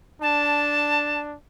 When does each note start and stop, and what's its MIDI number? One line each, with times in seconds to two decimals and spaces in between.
0.22 1.35 62
0.22 1.19 81